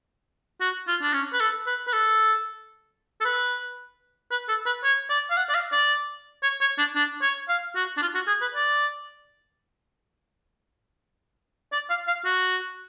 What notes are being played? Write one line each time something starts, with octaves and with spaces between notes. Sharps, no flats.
F#4
F4
D4
C#4
B4
A4
B4
B4
A4
A4
B4
B4
A4
B4
C#5
D5
F5
F#5
D5
F5
D5
C#5
C#5
D4
D4
C#5
F5
F#4
D4
F4
F#4
G#4
B4
D5
D5
F5
F5
F#4